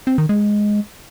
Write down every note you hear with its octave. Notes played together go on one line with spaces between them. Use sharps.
C4
D#3
G#3